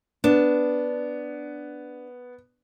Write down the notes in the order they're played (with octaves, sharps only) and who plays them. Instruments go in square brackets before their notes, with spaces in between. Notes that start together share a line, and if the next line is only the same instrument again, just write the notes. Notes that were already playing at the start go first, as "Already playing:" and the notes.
[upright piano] B3 [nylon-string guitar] D4